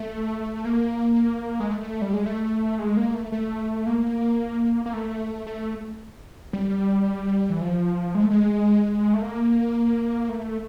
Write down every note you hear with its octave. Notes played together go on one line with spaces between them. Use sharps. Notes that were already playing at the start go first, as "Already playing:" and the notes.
Already playing: A3
A#3
G#3
A3
G3
G#3
A3
G#3
A#3
A3
A3
A#3
A#3
A3
A3
G3
E3
F3
G#3
A3
G#3
A3
A#3
A3